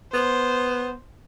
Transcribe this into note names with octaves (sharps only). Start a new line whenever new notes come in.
B3 C5